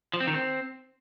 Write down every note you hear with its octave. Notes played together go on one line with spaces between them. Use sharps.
F3
C4
D#3
C4